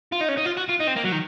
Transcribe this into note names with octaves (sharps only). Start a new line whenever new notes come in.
F4
D#4
C#4
D#4
F4
F#4
F4
D#4
C4
A#3
F#3
D#3